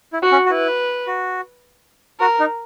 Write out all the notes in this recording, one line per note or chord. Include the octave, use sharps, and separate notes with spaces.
E4
F#4
C#4
F#4
E4 B4
F#4
F#4 A#4
D#4